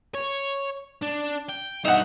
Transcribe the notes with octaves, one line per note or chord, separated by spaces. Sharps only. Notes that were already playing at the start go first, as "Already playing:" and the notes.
C#5
D4
G5
G2 D#4 E5 F#5